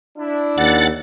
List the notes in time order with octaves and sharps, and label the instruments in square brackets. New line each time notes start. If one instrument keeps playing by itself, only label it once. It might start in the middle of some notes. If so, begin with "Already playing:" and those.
[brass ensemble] D4 E4
[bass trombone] D#2 [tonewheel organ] F#5 A6